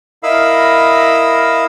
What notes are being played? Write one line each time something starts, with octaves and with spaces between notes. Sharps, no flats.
E4 A#4 D#5 F5 B5 E6